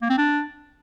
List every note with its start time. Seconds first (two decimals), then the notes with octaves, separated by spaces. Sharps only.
0.02 A#3
0.10 C4
0.18 D4